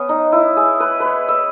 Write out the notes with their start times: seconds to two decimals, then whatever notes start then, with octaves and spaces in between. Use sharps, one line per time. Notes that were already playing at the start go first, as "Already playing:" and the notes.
Already playing: B3 C#4
0.09 D#4
0.32 E4
0.57 G#4
0.80 B4
1.00 B4
1.06 C#5
1.28 E5